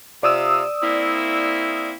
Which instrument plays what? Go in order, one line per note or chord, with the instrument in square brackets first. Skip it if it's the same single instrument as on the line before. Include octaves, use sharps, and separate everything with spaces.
[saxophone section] C3 F4 [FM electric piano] D5 D#6 E6
[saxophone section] A#3 C4 E4